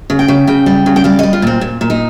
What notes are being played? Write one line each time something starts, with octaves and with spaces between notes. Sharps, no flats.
C#3
G5
C#3
C#3 G5
G3
C#3
G5
G3 F5
G3 D#5
F4
A#2 C4
A#2
A#2
D#4